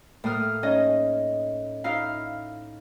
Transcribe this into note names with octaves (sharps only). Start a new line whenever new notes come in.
A2 A#3 D#6 F6
C#4 D#4 D#5
D#4 E4 F5